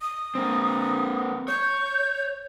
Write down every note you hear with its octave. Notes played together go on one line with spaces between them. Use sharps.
D#6
A#3 C4
C#5 G6